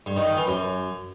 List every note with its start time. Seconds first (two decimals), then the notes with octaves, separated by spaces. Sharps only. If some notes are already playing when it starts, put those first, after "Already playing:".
0.06 G2
0.17 D#3
0.27 D#3
0.37 E3
0.47 F#2